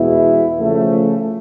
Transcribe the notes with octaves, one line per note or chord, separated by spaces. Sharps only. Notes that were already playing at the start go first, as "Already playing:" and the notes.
Already playing: E2 B2 G#3 B3 E4
C#3 F3 A3